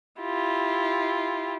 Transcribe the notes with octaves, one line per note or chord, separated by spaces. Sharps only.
E4 F4 G4